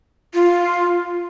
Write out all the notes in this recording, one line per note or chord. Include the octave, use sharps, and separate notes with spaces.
F4